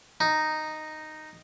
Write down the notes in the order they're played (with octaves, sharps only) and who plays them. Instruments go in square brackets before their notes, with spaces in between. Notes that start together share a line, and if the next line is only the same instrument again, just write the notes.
[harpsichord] D#4